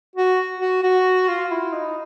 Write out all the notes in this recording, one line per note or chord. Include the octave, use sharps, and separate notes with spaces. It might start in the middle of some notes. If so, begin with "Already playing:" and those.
F#4
F#4
F#4
F4
E4
D#4